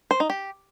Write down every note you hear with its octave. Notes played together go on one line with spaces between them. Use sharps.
C5
D#4
G4